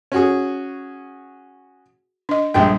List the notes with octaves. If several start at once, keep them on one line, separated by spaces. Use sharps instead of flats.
C#4 F#4 G#4
D4 D#5
A#1 G3 G#3 D4 G5